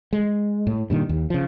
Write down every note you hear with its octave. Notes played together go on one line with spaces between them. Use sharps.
G#3
A2
G2 A#2 D#3
D#2
C#3 F3